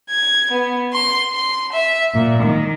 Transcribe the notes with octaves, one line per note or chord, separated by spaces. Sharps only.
G#6
B3
C6
C6
E5
A#2
D#3